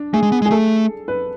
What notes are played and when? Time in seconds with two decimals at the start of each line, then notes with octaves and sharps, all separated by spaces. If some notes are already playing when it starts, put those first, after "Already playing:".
Already playing: D4
0.13 A3 G#4
0.23 G#3
0.32 B3
0.42 G#3
0.46 G#4
0.51 A3 A4
1.08 B4